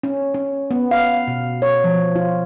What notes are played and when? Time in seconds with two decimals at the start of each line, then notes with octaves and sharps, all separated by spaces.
0.03 C#4
0.34 C#4
0.71 B3
0.91 F5
1.28 B2
1.62 C#5
1.84 F3
2.16 F4